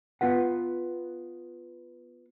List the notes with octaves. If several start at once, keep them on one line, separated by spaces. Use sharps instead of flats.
B3 F4 B4 F#5